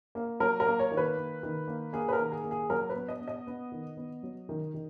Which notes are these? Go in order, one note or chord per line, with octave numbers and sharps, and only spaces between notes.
A#3
F#3 A#4
A#4
A#3
C#5
D#3
B4
A#3
D#3
A#3
A#3 G#4
B4
A#4
D#3
G#4
A#3
G#4
F#3 A#4
B4
B3
D#5
B3
D#5
B3
D#3
B3
F#3
D#3
D#3